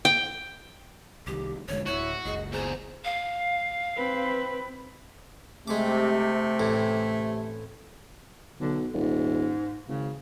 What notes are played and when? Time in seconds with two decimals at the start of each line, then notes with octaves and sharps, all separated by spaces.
0.05 G5
1.27 C2 D#3 G4
1.68 E1 D3 G#3 C#5
1.86 D1 E4 F#4 C#5
2.25 F#1 C#2 G#4 D#5
2.52 E2 G#4 C5 A#5
3.04 F5
3.97 C4 B4
5.68 C3 G#3 A3 D6
6.59 A1 A2
8.60 B1 D3
8.93 D#1 G#2
9.88 G#1 C#3